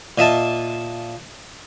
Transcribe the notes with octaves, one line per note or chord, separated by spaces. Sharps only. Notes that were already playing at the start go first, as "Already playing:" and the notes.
A#2 D#5 E5 A5